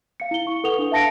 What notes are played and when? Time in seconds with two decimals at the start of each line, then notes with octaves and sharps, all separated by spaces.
0.20 F5 C#7
0.31 E4 G7
0.47 C#6
0.64 A4 B4 F#5 D#6 F7 G7
0.78 D4
0.92 E5 F5 A5 A#6 C#7 D7